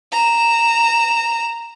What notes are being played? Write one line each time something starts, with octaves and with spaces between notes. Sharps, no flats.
A#5 E7